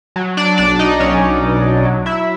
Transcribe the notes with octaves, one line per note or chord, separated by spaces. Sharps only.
F#3
D4 D5
B1 D4 D5
D#4 D#5
B1 C#4 C#5
B2
F#3
E4 E5